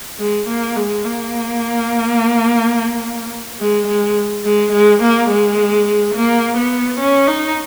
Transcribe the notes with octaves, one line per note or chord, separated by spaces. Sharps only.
G#3
A#3
G#3
A#3
G#3
G#3
G#3
G#3
A#3
G#3
A#3
B3
C#4
D#4